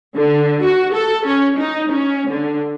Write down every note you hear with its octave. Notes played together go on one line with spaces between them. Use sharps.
D3
F#4
A4
C#4
D#4
C#4
D3